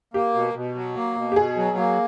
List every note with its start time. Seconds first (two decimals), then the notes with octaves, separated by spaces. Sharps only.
0.14 A#3 G4
0.34 B2
0.54 B2
0.75 F#3
0.96 A#3
1.16 B2
1.32 G4
1.36 B2 G#4
1.57 F#3
1.77 A#3